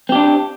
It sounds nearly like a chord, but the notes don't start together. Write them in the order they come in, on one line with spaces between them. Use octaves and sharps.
C4 G4 D4